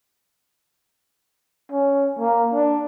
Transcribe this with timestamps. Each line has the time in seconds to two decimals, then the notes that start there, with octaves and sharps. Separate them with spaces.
1.72 C#4
2.19 A#3
2.54 D4